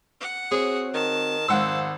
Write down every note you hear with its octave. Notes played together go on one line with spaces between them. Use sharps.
F#5
C4 F#4 G#4 C#5
D#3 A5
G#1 F2 G#3 C5 F5 F#5 E6